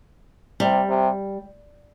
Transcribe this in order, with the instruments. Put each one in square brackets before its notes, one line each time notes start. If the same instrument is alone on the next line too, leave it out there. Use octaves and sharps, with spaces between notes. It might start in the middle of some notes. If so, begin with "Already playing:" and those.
[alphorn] C3 [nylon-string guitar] G3
[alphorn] C3